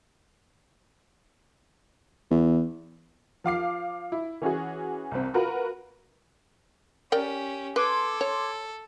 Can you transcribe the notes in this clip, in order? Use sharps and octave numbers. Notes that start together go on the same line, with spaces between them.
E2
F3 F5 D6 C7
E4
E3 C#4 F#4 G#4
C2 C4
F4 F#4 A#4 B4
C#4 G4 A#4 D5 G5
A4 B4 C6 D6 G#6
C#5